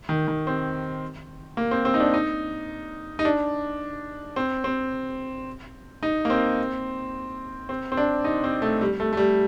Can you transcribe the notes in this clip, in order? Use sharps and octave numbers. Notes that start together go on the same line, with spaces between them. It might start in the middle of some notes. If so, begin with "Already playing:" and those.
D#3
D#3
C4
A#3
C4
C4
D#4
D4
D#4
D#4
D4
C4
C4
D#4
A#3
C4
C4
C4
D4
D#4
C4
A3
G3
A3
A3
G3